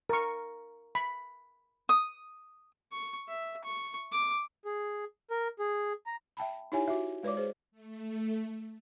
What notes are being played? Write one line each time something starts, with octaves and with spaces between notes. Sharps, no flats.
A#4 C#6
B5
D#6
C#6
E5
C#6
D6
G#4
A#4
G#4
A#5
E5 G5 A5 B5
D#4 E4 G4 C#5 E5 G#5
F#4 E5
G#3 B4 C#5 D5 D6
G#4 C5
A3